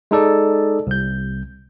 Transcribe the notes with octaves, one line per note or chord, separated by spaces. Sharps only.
G#3 D#4 A4 D5
C2 G6